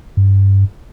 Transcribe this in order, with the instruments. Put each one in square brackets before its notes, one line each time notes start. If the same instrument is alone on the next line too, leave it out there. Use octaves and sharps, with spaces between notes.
[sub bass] G2